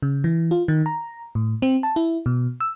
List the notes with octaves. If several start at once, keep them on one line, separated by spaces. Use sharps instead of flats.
C#3
E3
F4
D#3
A#5
A2
C4
A5
E4
B2
E6